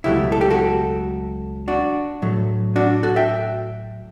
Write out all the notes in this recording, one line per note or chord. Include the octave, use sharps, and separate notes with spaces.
C#2 B2 F#3 A3 E4 G4
A4
G4
F#4 A4
D4 F#4
A2 F#3 A3
D4 F#4
F#4 A4
E5 G5